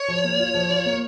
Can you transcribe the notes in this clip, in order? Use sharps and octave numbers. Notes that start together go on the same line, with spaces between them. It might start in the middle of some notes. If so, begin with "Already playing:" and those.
Already playing: C#5
F3
A#3
F4
F3
F4
A#3